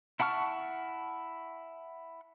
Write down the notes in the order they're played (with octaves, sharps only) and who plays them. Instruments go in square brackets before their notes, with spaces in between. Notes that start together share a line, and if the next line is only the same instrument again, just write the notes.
[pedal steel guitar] E4 F#5 A5 C#6 F6